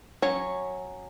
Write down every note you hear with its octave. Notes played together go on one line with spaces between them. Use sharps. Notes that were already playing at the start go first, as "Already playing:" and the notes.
F#3 C#4 C#5